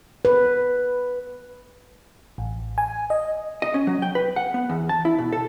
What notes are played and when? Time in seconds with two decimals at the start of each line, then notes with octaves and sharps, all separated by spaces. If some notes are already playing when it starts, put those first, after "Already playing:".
0.25 B4
2.38 A1
2.78 G#5
3.10 D#5
3.62 D#5
3.74 C#4
3.87 F#3
4.02 G5
4.15 B4
4.36 F#5
4.54 B3
4.70 E2
4.89 A5
5.05 E4
5.18 B2
5.32 A4